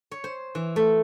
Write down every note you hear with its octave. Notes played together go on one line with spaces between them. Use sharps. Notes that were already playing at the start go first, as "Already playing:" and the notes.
C#5
C5
E3
A3